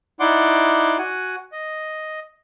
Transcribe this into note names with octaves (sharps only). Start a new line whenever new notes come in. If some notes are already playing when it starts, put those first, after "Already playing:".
D#4 E4 D5 F#5 C6 D6
F#4 F#5 G#5
D#5